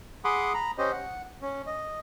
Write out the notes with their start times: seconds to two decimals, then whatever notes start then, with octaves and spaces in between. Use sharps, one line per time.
0.25 G#4 F#5 B5 C6 D6 D#6
0.54 A#5 B5
0.78 C#4 G4 C5 D#5
0.92 F#5
1.42 C#4
1.67 D#5